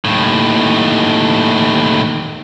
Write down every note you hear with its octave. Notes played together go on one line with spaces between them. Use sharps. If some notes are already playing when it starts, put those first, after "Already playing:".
D#2 A2